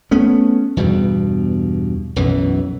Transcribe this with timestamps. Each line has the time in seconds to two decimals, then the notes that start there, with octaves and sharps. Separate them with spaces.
0.11 A3 B3 C#4
0.77 E2 G2 B2 G3
2.16 B1 F#2 E3